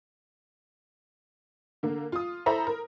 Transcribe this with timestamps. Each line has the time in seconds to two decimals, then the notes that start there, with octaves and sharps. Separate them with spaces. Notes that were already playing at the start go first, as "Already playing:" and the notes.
1.83 D3 A#3
2.12 F4 D#6
2.46 E4 A4 C5 E5 A#5 B5
2.67 A#4